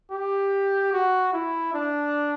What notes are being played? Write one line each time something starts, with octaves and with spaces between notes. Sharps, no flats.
G4
F#4
E4
D4